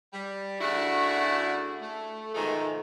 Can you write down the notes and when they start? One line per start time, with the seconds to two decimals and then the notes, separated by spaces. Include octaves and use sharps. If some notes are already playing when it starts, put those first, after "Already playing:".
0.13 G3
0.61 C#3 A3 D4 E4 F#4
1.81 A3
2.34 G#2 B2 D#3 F3 G#3 A3